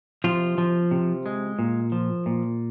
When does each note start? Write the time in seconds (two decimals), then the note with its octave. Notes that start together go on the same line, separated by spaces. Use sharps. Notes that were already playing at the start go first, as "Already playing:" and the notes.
0.24 C3 F3 F4
0.58 F3
0.91 C3
1.26 G#3
1.59 A#2
1.92 F3
2.26 A#2